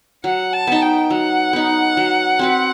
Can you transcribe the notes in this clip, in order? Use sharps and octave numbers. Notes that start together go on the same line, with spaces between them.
F#3 F#5
A5
B3 D#4
G5
F#3 F#5
B3 D#4
F#3
C4 F#4 B4